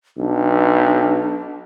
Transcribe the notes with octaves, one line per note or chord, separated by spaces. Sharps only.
B1 D4